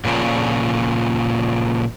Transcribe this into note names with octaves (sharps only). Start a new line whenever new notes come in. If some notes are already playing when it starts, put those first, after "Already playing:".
A#2 C#3 F3